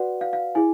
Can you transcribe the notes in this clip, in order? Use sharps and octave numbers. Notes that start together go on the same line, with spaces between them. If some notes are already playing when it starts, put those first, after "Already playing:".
Already playing: F#4 B4 D5 F#5
F5
F5
E4 G#4 G#5